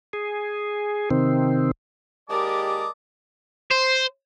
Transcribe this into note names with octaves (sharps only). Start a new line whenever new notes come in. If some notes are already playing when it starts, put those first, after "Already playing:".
G#4
C3 D#3 C4
D#2 G#3 G4 A#4 D5 D#5 A5 D6
C5